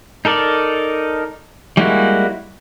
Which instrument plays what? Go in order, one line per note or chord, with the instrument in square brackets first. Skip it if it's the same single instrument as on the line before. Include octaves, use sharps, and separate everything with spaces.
[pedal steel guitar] D#4 A4 A#4 D5
G3 G#3 A#3 E4 F#4